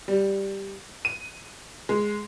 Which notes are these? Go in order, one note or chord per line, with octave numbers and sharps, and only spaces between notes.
G3
D#7
G#3